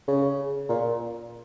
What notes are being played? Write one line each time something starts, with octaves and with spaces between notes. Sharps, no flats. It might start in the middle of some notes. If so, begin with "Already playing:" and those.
C#3
A#2